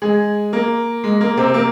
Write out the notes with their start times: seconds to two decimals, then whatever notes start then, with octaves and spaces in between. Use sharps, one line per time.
0.02 G#3 G#4
0.53 A#3
1.04 G#3
1.21 A#3
1.37 C3 C4
1.54 A#3